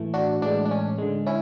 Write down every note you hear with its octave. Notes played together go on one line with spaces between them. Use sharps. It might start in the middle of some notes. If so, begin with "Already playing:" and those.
Already playing: A2 E3 A3
D4 F#4
A2 E3 G#3 D4
D4
C#4
D3 G#3
C#4 E4